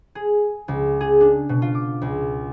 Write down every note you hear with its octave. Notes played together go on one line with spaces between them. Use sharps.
G#4
C#2
G#4
D4
B2
F4
D6
C#2